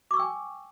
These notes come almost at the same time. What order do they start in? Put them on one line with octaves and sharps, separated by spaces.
D6 C#6 E6 G5 G#5